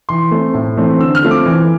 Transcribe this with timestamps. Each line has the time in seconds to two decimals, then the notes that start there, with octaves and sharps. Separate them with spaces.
0.09 E3 C6
0.31 A3 C4
0.54 A2
0.77 E3 A3 C4
1.00 D3 E6
1.15 F6
1.23 F3 A3 C4
1.31 D6
1.46 E3